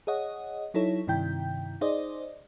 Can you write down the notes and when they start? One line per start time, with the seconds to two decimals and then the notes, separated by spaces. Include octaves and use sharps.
0.07 G#4 C#5 D#5 F#5
0.74 F#3 D#4 E4 A4 C#5
1.07 G2 C3 D#3 E4 G5 G6
1.81 D#4 G#4 C5 D5 D#5